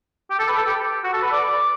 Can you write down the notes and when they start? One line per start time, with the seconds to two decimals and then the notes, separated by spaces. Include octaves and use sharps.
0.30 G4
0.39 A4
0.48 B4
0.57 A4
0.66 G4
1.04 F#4
1.13 A4
1.22 B4
1.32 D5